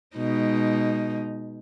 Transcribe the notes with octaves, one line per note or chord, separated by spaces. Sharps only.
B2 G#3 D#4